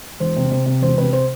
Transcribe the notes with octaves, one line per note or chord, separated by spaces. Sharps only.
E1 C5
C3
C3
C3
E1 C5
C3 B4
C5